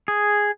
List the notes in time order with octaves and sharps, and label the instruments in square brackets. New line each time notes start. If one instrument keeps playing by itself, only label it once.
[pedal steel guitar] G#4